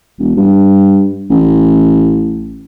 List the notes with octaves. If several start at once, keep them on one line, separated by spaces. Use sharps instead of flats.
E1
G2
A1